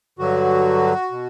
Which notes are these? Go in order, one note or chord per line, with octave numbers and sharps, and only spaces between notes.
G2 D3 F#3 F#4
B2